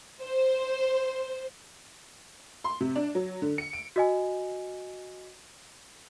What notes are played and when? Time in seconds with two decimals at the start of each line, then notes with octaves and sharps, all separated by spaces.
0.22 C5
2.64 C6
2.81 C3
2.96 D4
3.15 F#3
3.42 D3
3.58 C#7
3.73 D7
3.96 F#4 D#5 G#5